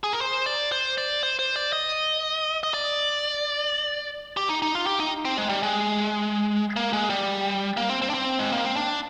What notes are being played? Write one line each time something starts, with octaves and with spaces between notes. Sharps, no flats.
G#4
A#4
C5
D5
C5
D5
C5
C5
D5
D#5
D#5
D5
G4
D#4
D#4
F4
G4
D#4
C4
G#3
G3
G#3
A#3
G#3
G3
A#3
C4
C4
D4
C4
G#3
A#3
C4
D4